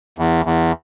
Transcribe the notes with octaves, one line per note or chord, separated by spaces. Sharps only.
E2
E2